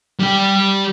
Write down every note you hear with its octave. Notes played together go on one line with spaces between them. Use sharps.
G3 G4